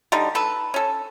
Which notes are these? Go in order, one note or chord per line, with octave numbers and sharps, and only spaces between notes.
D3 G3 D#4
A4 B4
C#4 A4